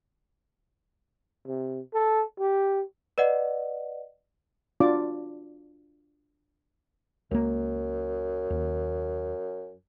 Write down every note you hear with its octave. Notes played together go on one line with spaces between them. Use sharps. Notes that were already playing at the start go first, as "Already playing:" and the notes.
C3
A4
G4
B4 D5 D#5 F#5
D4 F4 F#4 D5 D6
C#2 F#2 A#3
D#2